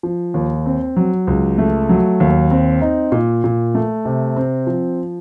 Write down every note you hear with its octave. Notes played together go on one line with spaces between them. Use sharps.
F3
D#2
C4
F#3
C#2
A3
F#3
D#2
C4
D#4
A#2
A#2
A3
C3
C4
F3